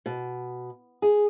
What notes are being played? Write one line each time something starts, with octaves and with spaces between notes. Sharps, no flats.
B2
G#4